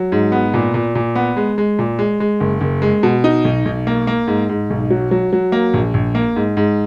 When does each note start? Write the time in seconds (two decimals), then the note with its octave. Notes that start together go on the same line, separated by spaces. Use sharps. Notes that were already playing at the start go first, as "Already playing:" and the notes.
Already playing: F#3
0.12 G#2
0.32 B3
0.54 A#2
0.74 A#2
0.95 A#2
1.15 B3
1.37 G#3
1.58 G#3
1.79 A#2
1.99 G#3
2.20 G#3
2.40 F#1
2.61 F#1
2.82 G#3
3.03 B2
3.24 D#4
3.45 B1
3.65 B1
3.87 A#3
4.07 A#3
4.27 G#2
4.49 G#2
4.70 B1
4.90 F#3
5.11 F#3
5.33 F#3
5.52 A#3
5.74 A#1
5.94 A#1
6.15 A#3
6.36 G#2
6.57 G#2